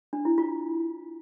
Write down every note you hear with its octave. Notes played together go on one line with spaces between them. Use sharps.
D4
E4
F4